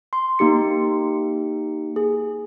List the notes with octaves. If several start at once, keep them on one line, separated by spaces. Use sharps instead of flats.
C6
A#3 D#4 G4 C#7
G#4